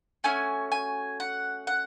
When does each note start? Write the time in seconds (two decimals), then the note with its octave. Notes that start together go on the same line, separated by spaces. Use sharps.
0.24 A3 C#4 F#4 G#5
0.72 G#5
1.20 F#5
1.67 F#5